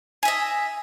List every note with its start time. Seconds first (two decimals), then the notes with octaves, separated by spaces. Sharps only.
0.23 G#5
0.25 E5
0.28 D#5